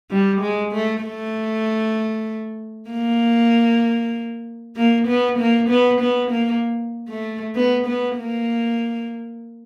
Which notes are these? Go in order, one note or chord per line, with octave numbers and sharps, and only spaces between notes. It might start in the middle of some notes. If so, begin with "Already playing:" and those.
G3
G#3
A3
A3
A#3
A#3
B3
A#3
B3
B3
A#3
A3
B3
B3
A#3